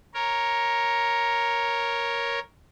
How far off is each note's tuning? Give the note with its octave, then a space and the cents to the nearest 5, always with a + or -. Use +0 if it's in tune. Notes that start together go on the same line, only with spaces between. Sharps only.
A#4 +5 C#5 +0